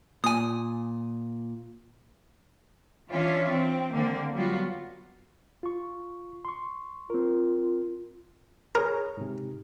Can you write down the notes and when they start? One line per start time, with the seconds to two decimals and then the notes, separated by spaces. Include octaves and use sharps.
0.24 A#2 G#5 D#6
3.11 E3 C#4 D4 F4 C#5 E5
3.51 C4
3.92 D3 G#3 A#3 C4
4.34 F#3 G3 B3 F4 F#4
5.63 F4 C#6
6.45 C6 C#6
7.10 C4 F4 A#4
8.75 G#4 A#4 C#5 G#5
9.17 G#2 C3